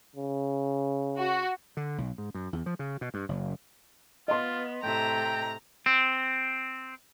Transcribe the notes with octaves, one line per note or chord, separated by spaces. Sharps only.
C#3
F#4
D3
B1
G#2
F#2
E2
F3
C#3
B2
G2
F#1
B3 F4 D#5 C6
A2 C3 A3 G5 A#5
C4